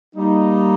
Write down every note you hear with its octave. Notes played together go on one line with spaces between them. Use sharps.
G3 A#3 D#4